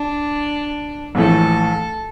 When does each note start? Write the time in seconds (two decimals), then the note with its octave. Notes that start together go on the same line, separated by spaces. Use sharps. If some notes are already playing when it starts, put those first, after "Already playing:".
Already playing: D4
1.15 A#1 A2 E3 A3 A4